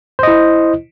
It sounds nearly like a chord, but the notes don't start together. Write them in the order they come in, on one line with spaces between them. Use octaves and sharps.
C5 D#5 E4